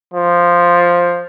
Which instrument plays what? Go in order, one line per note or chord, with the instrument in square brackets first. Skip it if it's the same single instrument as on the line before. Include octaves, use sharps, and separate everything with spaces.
[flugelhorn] F3